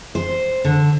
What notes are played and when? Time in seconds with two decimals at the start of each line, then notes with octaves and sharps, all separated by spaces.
0.15 C5
0.65 D3